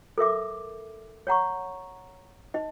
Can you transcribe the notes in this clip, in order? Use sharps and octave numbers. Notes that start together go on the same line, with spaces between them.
A4 A#4 E5 D6
C#5 F#5 A#5 C#6
D#4 D#5